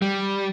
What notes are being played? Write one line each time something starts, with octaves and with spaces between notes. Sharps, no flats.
G3